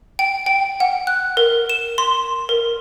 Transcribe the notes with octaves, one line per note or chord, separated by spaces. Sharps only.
G5
G5
F#5
F#6
A#4
E7
C6
A#4